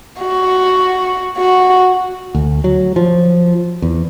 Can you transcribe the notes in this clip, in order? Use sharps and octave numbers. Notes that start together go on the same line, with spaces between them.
F#4
F#4
D2
F#3
F3
E2